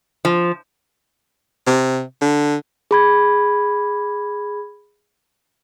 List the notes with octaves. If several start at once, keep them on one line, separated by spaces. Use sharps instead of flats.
F3
C3
D3
G#4 B5 G#6